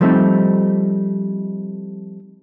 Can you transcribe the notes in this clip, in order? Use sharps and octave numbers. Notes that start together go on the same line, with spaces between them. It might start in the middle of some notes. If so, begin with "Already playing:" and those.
F3 G3 A3 C4 D#4